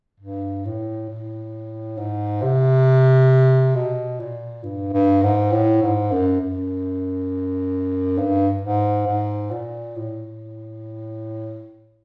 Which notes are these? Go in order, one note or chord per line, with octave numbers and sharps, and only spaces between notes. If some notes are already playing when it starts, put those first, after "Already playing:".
G2
A2
A2
G#2
C3
B2
A#2
G2
G2
G#2
A2
G#2
F#2
F#2
G2
G#2
G#2
A#2
A2